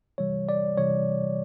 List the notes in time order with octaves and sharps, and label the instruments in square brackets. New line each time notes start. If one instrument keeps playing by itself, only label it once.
[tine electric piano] C3 E3 G3 C#5
D5
C3 E3 G3 C#5